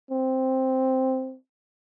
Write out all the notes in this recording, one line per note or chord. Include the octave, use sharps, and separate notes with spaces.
C4